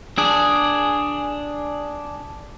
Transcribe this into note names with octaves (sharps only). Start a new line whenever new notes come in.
D4 G#4